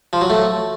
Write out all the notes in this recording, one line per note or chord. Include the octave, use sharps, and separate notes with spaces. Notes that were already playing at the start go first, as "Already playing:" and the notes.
F3
F#3
A3